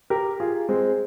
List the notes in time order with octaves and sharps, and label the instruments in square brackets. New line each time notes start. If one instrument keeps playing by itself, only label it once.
[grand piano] G4 A#4
F4 G#4
G#3 C4